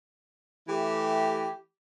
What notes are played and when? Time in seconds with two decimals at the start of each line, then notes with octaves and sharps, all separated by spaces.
0.68 E3 A3 G4